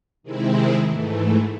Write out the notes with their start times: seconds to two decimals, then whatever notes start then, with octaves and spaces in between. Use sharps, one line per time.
0.23 C3 D#3 G#3 C4 E4
0.85 G#2 E3 A3